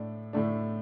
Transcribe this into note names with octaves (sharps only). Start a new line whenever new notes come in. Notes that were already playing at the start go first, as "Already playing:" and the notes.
Already playing: A2 A3 D4
A2 A3 D4